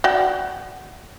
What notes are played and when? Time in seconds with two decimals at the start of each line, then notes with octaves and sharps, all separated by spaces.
0.04 F#4 D5 G5